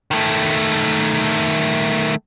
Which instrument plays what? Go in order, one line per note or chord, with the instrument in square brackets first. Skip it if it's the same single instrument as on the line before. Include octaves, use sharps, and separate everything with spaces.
[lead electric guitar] D#3 A3